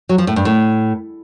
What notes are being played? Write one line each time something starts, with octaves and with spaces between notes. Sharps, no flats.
F#3
F3
A2
G2
A2